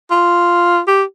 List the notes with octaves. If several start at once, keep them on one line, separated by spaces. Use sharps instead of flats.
F4
G4